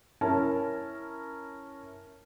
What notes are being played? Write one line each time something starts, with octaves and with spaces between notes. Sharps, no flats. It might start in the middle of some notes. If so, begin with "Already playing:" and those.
C#4 E4 A#4 A5